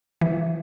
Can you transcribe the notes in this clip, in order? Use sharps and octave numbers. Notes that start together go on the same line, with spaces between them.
E3